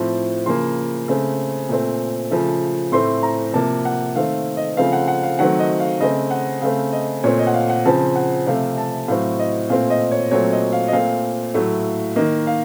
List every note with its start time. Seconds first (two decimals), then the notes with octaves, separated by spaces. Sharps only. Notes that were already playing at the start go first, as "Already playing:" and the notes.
Already playing: A2 F3 C4
0.46 C#3 F3 A#3 C6
1.08 C#3 A3 C4
1.69 A#2 A3 C4
2.31 C#3 F3 A3
2.92 A2 A3 C4 C6
3.23 A#5
3.53 C3 F3 A#3 A5
3.85 F#5
4.16 D#3 A3 C4 F5
4.57 D#5
4.77 C#3 F3 A3 C4 F5
4.93 F#5
5.08 F#5
5.23 F5
5.39 D#3 F#3 A3 C4 F#5
5.59 D#5
5.80 F5
6.00 C#3 A3 C4 D#5
6.31 F#5
6.62 C#3 A3 C4 F5
6.93 D#5
7.24 A#2 A3 C4 C#5
7.39 D#5
7.47 F#5
7.54 F5
7.70 F#5
7.85 C#3 F3 C4 A5
8.16 F#5
8.47 C3 F3 A3 F5
8.78 A5
9.08 A2 F#3 C4 F5
9.39 D#5
9.70 A#2 A3 C4 F5
9.90 D#5
10.11 C#5
10.31 A#2 F#3 A3 C4 C#5
10.52 D#5
10.73 F5
10.88 D#5
10.93 A#2 A3 C4 F5
11.54 A2 F#3 A3
12.16 D#3 A#3 D#5
12.47 F5